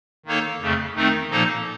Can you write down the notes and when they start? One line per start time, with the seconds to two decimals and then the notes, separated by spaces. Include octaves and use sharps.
0.26 D#3 A#3 D#4 A4 C#5
0.61 F2 C#3 A3
0.96 D#3 A3 C4 D#4
1.30 A#2 F3 A#3 D#4 A4